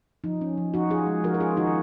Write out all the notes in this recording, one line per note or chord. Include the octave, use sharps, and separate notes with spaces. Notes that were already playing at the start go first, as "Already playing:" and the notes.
F3 D#4
C#4
F3
F3 D#4 F#4
F3 F4 G#4
G#3
F3 F#4 A#4
A#4
C#4 F4 G#4
D#3 D#4 F#4